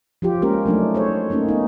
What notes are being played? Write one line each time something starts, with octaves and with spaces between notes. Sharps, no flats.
F3 F4 G4
G#3 A#3 C#4 G4 A#4
F#3 A3 D4 D#4
A4 C5 C#5
A3 A#3 C#4 D#4
B3 D#4